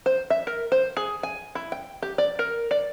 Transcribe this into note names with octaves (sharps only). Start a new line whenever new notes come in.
C5
E5
A#4
C5
G#4
G#5
E4
G5
G4
D5
A#4
D5